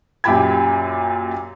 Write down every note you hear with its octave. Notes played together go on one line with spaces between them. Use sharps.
F#2 A#2 G4 G5 B5 G#6